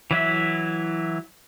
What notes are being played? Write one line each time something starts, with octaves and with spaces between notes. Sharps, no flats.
E3 F#3 E4 E5